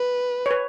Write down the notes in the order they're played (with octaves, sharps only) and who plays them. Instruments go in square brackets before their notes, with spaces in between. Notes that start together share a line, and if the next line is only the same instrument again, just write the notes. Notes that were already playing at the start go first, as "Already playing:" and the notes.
Already playing: [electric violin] B4
[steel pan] C#5
B4